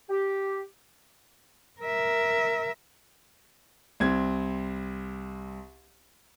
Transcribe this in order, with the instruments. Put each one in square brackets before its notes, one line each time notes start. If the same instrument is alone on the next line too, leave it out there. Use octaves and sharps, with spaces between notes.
[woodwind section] G4
[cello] A#4 E5
[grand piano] C2 C4 G#6